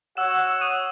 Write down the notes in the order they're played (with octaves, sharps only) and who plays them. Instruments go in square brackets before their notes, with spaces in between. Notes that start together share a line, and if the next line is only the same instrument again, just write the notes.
[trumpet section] F#4 C#5 F#5 [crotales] E6 E7
[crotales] E6 E7
E6 E7
D#6 D#7